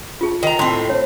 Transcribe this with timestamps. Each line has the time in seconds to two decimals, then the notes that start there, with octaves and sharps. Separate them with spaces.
0.21 F4 G#4 A5
0.43 D#3 A#5
0.59 A2 C4 D#5 C6
0.89 C5 C#5